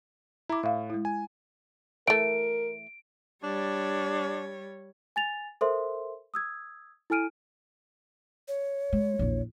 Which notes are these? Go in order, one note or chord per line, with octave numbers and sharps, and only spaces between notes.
E4 A#5 D6
A2 E5 F5
G#3 E4
G#5
E3 A3 A#4 D7
G3 D4 C#5
G#5 A6 F7
A4 A#4 C5 E5 C6
D#6 E6 G#6
E4 A4 G#5 F6 D7 D#7
C#5
G#3
A#1 E2